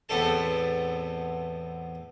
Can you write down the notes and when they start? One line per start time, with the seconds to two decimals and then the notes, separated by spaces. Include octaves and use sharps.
0.09 E2 A2 B3 C4 A4 A5